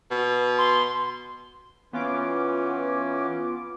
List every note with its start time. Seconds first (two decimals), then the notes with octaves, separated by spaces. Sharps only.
0.11 B2
0.58 C6
1.93 E3 B3 C#4 F4 D6